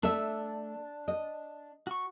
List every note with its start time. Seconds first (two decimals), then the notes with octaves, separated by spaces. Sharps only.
0.03 A3 D4 E5
1.08 D#5
1.87 F#4 C#6